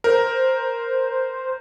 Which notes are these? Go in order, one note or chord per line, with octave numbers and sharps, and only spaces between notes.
A#4 C5